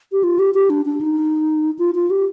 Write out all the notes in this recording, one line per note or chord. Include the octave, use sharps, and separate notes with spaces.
G4
F4
G4
G4
D4
D4
D#4
F4
F4
G4